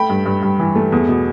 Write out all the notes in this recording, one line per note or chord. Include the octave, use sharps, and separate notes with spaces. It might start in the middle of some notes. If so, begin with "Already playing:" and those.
Already playing: A3 G5 B5
G2
G2
G2
E3
A3
E2
B2